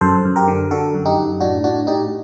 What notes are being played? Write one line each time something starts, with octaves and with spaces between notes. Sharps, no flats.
F#2 A4 C5
F#2
G4 A#4
D3
D3 F#4 A4
F#2
D#4 G4
F#2
A2 D4 F#4
A2 D4 F#4
A2 D#4 G4